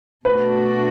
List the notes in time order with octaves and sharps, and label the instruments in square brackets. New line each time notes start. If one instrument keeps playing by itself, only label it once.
[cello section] B2 A3 D4 F#4 [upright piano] B4